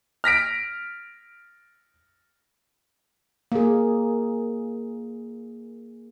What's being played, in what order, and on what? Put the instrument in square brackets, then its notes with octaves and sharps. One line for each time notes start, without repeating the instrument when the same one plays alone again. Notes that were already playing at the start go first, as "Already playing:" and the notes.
[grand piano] F6 A#6 B6 D7
[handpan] A#3 G#4